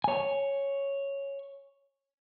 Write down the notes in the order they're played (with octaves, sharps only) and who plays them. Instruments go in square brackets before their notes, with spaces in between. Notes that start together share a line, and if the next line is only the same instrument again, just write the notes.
[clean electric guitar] C#5 G#5